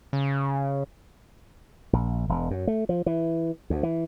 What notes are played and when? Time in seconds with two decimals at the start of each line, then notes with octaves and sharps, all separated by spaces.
0.13 C#3
1.93 A#1
2.29 E1
2.51 F#2
2.67 A3
2.89 F3
3.06 E3
3.70 D2
3.83 E3